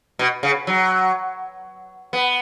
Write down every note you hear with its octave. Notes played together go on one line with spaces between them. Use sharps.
B2
C#3
F#3
B3